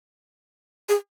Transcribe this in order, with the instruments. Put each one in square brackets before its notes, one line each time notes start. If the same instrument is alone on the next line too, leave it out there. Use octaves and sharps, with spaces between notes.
[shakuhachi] G#4